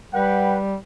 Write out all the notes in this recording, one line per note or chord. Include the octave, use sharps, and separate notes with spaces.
G3 B4 F#5 G5